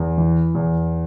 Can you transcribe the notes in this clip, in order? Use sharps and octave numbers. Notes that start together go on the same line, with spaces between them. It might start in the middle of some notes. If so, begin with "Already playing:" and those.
Already playing: E2
E3
E2